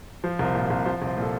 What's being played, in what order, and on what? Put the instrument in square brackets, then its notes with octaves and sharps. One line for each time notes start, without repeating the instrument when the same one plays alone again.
[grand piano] F3 C5
C2 A#4
C5
A#2
C5
C2
F3 C5
C2
C5
A#2 A4